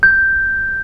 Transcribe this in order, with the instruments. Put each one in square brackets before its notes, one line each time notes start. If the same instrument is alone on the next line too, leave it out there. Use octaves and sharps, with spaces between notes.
[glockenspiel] G6